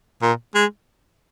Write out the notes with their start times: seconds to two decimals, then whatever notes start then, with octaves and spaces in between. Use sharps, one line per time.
0.22 A#2
0.55 G#3